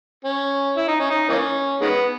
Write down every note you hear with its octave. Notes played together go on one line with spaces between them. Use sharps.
C#4
E4
D#4
C#4
D#4
E3 A#3 C#4
D#3 G#3 B3